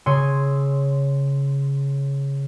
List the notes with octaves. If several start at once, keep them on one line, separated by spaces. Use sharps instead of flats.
C#3 C6 E6 G#6 C#7 D#7